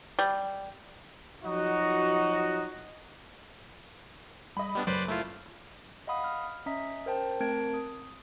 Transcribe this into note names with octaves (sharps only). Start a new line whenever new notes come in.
G3
F3 F#3 D#4 F#4
G3 D#5 B5
G3 B3 D4
F#1 F#3 B4 C5 D5
A3 E4 F4
D#5 F5 F#5 B5 D#6
F6
C#4 D#5 E5 A#5 D#6 B6
A#4 C5 G5 A5
A3 C4 A#4 A5 G#6 D7
D#6